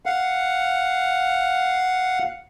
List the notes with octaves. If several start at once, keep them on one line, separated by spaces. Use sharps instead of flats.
F5 F#5